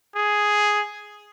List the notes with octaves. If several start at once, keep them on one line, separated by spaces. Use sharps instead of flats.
G#4